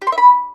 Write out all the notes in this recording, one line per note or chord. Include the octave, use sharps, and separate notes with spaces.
G4
C6
E5
B5